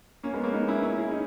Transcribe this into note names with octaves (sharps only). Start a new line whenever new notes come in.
A#3 C#4
G#3 B3
A#3 C#4
B3 D#4
C#4 E4
C#4 E4
E4 G#4
D#4